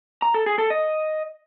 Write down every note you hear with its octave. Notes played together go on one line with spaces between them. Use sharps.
A#5
A4
G#4
A4
D#5